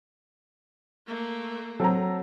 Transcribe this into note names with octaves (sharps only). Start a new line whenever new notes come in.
A3 A#3
F#3 C4 A4 A#5